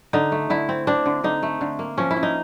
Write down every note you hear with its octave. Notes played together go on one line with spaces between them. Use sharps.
D3 D#4
A3
D3 E4
C4
C4 D4
D3
D3 D#4
A3
D3
A#3
F3 C#4
E4
C#4
D#4